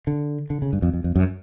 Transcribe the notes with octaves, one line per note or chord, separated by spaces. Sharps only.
D3
D3
C#3
G2
F2
F2
F2
F#2